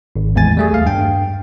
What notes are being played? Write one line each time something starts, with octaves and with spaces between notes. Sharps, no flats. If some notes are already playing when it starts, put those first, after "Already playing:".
G#1
E2 A2 G#3 G#5 A6
G3 A3 G#4
D#2 F5
G2 G5